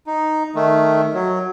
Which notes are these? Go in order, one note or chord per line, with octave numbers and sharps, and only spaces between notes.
D#4
D#3 A3
F#3